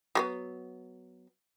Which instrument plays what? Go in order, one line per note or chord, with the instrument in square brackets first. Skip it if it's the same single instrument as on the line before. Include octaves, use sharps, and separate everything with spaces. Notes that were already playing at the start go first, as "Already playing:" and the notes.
[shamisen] F#3 A3 B3